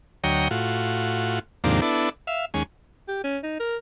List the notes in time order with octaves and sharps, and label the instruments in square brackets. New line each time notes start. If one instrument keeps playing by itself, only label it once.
[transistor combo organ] D2 F#3 C#5 D#5 G5 A#5
A2 F4 F#4
D#2 G#2 C3 F3 A#3 D4
B3 D4 E4 A4
E5 F5
D#2 G#3 C#4
[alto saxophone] G4
C#4
D#4
A#4